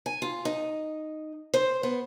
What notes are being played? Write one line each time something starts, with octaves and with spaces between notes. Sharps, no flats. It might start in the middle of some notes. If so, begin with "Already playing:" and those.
G#5
F4
D#4
C5
B3